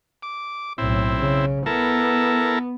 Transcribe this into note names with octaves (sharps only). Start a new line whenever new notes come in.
D6
B1 A2 C4 E4
C#3
B3 E4 A4 A#4